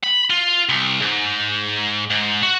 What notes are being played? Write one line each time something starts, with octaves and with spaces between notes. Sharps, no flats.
B5
F4
C2
G#2
G#2
F#4